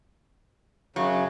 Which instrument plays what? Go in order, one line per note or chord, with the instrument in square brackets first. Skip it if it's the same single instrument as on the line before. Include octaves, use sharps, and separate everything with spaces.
[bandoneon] F#2 C#3 [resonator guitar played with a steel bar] F#3